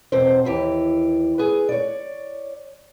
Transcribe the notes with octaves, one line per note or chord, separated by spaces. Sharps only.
E2 B2 C4 C5
D#2 E3 G4
G#4 B4
C#5 D5